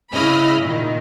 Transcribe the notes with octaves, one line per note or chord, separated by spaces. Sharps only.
C#3 E4 D#5 B5 F6
A#2 D#3